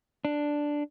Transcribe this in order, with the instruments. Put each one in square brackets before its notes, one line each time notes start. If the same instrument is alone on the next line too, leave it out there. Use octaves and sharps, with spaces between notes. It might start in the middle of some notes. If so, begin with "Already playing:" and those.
[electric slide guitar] D4